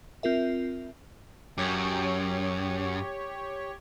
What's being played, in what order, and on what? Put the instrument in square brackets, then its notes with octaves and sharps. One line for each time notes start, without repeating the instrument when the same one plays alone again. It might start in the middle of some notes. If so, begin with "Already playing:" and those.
[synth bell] C4 F4 A#4 E5
[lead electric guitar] F#2 [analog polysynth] G4 C#5